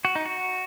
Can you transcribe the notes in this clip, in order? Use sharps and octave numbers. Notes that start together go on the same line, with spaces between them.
F#4
D#4
F#4